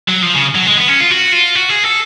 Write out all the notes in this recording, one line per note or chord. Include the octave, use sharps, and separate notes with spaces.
F#3
F3
C#3
F#3
G#3
B3
C#4
F4
F#4
F4
F#4
G#4
A4